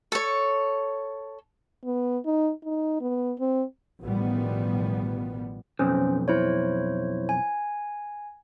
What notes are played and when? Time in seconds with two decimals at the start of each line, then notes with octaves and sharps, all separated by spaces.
0.12 A4 C#5
1.85 B3
2.25 D#4
2.64 D#4
3.01 B3
3.40 C4
4.01 A1 B2 D#3 F3 G3 B3
5.79 B1 F2 C#4 C5
6.28 E4 C5 C#5
7.29 G#5